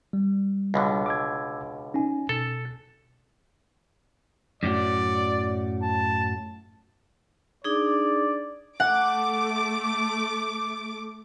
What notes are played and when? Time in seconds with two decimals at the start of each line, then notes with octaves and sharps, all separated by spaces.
0.13 G3
0.74 C#2 B2 D3
1.06 D6 E6 G#6
1.94 C#4 D#4 G#5
2.29 B2 A4
4.63 F#2 A2 F#3 D5
5.82 A5
7.64 D4 D#4 G#4 D5
8.80 A3 F#5 D6